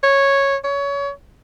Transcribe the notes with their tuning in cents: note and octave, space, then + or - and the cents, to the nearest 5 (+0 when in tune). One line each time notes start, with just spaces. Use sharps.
C#5 -5
C#5 +25